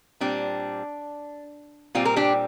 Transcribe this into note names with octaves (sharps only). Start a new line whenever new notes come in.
A#2 G3 C4 D4
A#2 G3 C4 F4
A#4
D4 G4